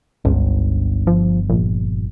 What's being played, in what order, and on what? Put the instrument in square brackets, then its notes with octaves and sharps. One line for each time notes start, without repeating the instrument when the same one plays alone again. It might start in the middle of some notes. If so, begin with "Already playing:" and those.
[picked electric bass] G1 [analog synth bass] C#2
[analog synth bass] F3
A#1